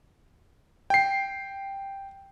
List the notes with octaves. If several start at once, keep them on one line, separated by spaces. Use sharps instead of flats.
G5 C7